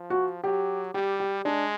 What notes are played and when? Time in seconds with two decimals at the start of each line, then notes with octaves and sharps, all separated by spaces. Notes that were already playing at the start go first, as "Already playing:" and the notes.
Already playing: F3
0.10 F#4
0.44 F#3 G4
0.94 G3 G4
1.20 G4
1.45 G#3 D4